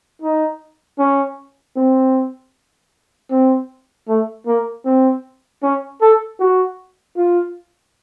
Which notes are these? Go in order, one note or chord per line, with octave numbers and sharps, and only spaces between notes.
D#4
C#4
C4
C4
A3
A#3
C4
C#4
A4
F#4
F4